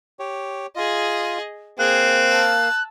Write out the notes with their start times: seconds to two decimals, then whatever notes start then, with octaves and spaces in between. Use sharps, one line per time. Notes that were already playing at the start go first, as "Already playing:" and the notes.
0.19 G4 C#5
0.76 F4 G#4 D#5
1.79 A#3 C4 G#4 F5 F#6
2.28 A5 E6